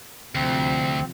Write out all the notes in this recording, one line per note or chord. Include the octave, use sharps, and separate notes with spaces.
D2 C3 F3 C4